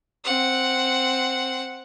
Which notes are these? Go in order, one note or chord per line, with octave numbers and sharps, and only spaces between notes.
C4 F#5